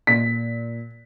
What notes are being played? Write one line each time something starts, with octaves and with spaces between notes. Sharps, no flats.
A#2 B6